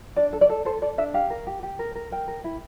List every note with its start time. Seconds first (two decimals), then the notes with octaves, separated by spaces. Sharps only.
0.16 D4 D5
0.33 A4
0.41 D5
0.49 A4
0.65 A4 C5
0.82 A4 D5
0.98 D4 E5
1.14 G4 F5
1.30 A#4
1.47 G4
1.63 G4
1.79 A#4
1.95 A#4
2.11 A#4 G5
2.28 A#4
2.44 E4